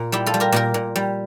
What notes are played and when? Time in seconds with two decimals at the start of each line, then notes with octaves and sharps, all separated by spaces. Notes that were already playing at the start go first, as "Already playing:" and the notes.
Already playing: A#2
0.12 G3 E4 G4
0.26 F4 A4
0.34 G3
0.40 G4 A#4
0.52 A#2 G4 A#4
0.74 A#2
0.96 G3